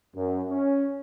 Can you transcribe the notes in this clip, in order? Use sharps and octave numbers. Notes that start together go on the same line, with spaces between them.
F#2
C#4